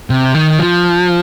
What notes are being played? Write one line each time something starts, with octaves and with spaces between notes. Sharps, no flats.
C3
D#3
F3